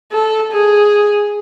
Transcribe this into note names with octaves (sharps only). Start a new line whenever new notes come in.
A4
G#4